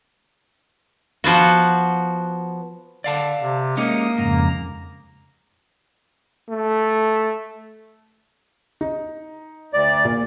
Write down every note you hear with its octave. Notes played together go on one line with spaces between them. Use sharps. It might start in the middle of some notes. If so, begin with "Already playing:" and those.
F3 B3 F#4
D3 D5 F5 A5
C3
G#3 A#3 C#4 D#4 D#6
F2 G#2 C#3 A#5
A3
D#4
D2 D5
A#2